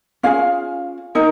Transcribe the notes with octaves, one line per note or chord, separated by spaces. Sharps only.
C#4 F4 G#4 F5
D#4 A#4